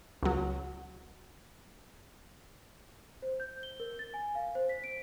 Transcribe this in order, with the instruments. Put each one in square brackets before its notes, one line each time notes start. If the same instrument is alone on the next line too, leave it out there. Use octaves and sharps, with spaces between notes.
[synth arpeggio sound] C#2 F#3
[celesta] C5
G6
G7
A#4
A6
G#5
F5
C5
B6
D7